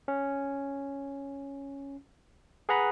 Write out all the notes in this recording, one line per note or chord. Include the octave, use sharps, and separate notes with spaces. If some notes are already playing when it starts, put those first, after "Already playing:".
C#4
G#4 B4 F#5 A#5 B5